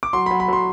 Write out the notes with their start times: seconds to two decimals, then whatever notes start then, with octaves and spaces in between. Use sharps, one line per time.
0.03 D6
0.13 F#3 C6
0.26 B5
0.31 F#3
0.40 B5
0.48 F#3 C6